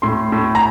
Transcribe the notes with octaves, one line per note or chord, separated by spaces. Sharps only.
A2 C6
A2
A#5